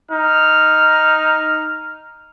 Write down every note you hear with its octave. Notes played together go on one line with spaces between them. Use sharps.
D#4 F6